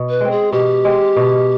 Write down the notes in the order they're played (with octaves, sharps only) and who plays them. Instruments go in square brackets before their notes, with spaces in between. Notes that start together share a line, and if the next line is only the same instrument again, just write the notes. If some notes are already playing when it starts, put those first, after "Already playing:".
Already playing: [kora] B2
[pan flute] B4
[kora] G#3 C4
[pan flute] G#4
[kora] B2 [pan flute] G4
[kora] G#3 C4
B2